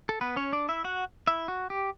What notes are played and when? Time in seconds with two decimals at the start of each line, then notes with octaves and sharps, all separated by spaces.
0.09 A4
0.21 B3 B4
0.36 C#4 C#5
0.53 D4 D5
0.69 E4 E5
0.84 F#4 F#5
1.27 E4 E5
1.48 F#4
1.70 G4